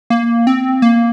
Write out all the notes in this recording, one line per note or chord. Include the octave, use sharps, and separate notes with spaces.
A#3
C4
A#3